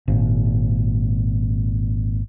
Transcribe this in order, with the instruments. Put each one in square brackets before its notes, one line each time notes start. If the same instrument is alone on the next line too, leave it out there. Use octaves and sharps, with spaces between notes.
[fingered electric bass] G#1 A#2